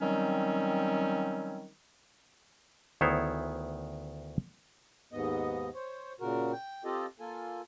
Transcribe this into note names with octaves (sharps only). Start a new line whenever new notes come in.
D#3 F#3 G3 C4 C#4
D2 D#3 B3 E4 C5 C#5
D#2 G#2 B3 D#5
C5 C#5
A#2 C#3 F#4 A#4
G5
C4 F4 G4 A4 D#5
A#3 F4 A4 G#5